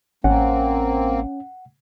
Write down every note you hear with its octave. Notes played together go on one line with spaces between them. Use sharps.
A1 A#3 C4 C#4 F#5